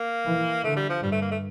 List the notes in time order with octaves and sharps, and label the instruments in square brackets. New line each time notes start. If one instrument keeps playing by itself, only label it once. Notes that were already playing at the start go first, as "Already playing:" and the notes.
Already playing: [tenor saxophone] A#3
[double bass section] E3
[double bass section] D3 [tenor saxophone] A3
[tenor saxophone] G3
F3
[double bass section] G2 [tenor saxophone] G3
[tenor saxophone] A3
A#3
A3